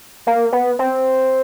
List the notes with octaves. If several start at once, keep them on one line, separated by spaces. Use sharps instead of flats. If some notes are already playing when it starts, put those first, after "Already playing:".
A#3
B3
C4